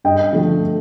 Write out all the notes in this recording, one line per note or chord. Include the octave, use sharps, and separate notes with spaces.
G2 D#5 G5
D3 F3 A3